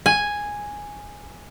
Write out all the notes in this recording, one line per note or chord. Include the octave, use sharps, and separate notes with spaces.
G#5